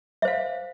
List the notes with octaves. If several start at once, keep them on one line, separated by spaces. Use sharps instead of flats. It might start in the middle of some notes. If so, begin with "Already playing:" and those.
C5 E5 F5